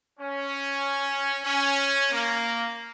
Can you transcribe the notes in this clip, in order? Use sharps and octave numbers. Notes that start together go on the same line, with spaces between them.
C#4
C#4
A#3